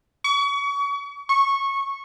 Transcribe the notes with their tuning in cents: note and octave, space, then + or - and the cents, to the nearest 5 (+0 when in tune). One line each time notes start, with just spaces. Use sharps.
C#6 +35
C#6 -15